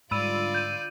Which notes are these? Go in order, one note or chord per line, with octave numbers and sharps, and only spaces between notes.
G#2 D3 G3 F4 D5 B5 E6 D#7
G6 D#7